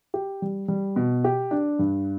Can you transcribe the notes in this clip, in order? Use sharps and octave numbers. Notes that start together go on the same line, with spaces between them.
G4
G3
G3
B2
G4
D4
G2